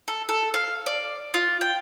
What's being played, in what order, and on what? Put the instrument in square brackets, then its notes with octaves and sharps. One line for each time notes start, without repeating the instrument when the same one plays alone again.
[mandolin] A4
A4
F5
D5
F4
G5